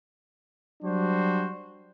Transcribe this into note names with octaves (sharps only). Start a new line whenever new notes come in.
F#3 G3 D4 F#4 C5